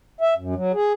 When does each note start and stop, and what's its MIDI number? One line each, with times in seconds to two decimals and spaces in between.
0.21 0.34 76
0.37 0.55 42
0.55 0.72 54
0.74 0.93 68